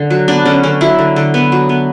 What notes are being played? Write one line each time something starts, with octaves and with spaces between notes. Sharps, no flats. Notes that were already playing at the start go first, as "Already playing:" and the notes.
Already playing: D3
F#3
B3 D4
D3 C#4
D3 C#4
F#3 E4
D3
D3
B3
F#3
B3